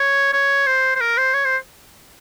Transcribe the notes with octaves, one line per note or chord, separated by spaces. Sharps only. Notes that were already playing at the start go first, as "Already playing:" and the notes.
Already playing: C#5
C#5
C5
C5
A#4
C5
C#5
C5